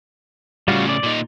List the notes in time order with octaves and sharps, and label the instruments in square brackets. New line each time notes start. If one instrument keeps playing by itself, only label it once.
[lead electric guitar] A2 C#3 [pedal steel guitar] G3 F4 F#4
[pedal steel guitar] D5
[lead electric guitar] A#2 D#4